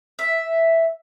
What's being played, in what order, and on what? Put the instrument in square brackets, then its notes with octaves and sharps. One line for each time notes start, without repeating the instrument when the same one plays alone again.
[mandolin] E5